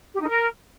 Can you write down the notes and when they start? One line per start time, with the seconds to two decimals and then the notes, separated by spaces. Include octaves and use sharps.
0.13 G4
0.20 D#4
0.28 A#4